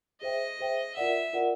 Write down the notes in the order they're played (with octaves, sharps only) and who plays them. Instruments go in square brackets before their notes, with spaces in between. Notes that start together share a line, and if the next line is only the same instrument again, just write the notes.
[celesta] G#4 C5 E5 G5 [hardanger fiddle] D#5
[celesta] G#4 C5 E5 G5
[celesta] F4 A#4 D5 F#5 [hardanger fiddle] E5
[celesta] F4 A#4 D5 F#5